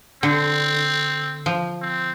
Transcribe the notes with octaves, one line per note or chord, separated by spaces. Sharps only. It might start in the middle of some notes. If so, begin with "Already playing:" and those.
D3 C4
F3
C4